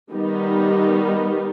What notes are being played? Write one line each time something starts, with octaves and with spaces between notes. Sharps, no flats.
D#3 G3 B3 D#4